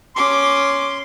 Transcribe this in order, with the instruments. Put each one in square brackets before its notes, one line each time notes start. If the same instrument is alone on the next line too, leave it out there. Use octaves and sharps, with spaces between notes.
[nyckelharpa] C#4 D6 [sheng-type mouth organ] C6